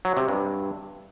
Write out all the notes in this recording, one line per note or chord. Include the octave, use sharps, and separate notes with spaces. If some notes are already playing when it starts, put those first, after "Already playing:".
F#3
C3
G2